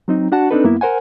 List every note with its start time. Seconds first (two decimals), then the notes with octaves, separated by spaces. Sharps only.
0.08 F#3 C4 D#4
0.32 D4 F#4 F#5 A5
0.51 C4 D4 D#4 A4 B4
0.64 F#2 A#3 B3 E4
0.81 A#4 C5 F#5 G#5